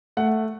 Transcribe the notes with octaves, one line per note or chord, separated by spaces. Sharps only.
A3 F#5